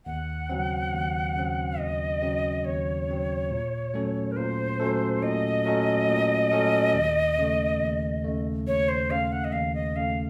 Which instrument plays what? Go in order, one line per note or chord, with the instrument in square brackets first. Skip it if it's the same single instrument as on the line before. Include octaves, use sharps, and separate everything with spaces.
[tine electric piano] D#2 [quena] F#5
[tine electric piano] C#3 F#3 C4
D#2
C#3 F#3 C4
[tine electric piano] D#2 [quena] D#5
[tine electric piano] C#3 F#3 C4
[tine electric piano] D#2 [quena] C#5
[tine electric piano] C#3 F#3 C4
A#2
F#3 A3 C#4 A4
[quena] A#4
[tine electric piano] A#2 [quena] C5
[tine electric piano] F#3 A3 C#4 A4
[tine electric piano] A#2 [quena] D#5
[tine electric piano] F#3 A3 C#4 A4
A#2
F#3 A3 C#4 A4
D#2
C#3 A3
D#2
C#3 A3
[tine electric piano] D#2 [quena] C#5
[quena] C5
[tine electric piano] C#3 A3 [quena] F5
[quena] F#5
D#5
[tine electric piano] D#2 [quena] F5
[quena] D#5
[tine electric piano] C#3 A3 [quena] F5